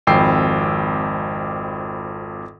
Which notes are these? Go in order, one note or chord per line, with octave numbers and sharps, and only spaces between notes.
G#1 F2 G5 B5 E6 C7